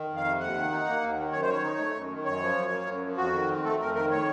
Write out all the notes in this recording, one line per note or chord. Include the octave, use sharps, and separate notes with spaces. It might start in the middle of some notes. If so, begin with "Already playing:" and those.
Already playing: D#3
F2
F5
C3
D#2 F#5
D#3
D#4
A#3
D#2
D#3
F#2 C#5
C5
D#3 C#5
D#4
A3
F#2
D#3
F#2 C#5
F3
F#2
A#3
F#2
F3
F2 F#4
D#3
C4
A3 A4
F2 A#4
D#3 A#4
A2 C#5